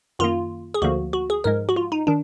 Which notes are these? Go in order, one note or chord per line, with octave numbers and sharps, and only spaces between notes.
F#2 D#3 A#3 F4
G#4
D2 D3 F3 A#3 F#4
F#4
G#4
G#2 F3 G#3 A#4
F#4
F4
D#4
D#3 D4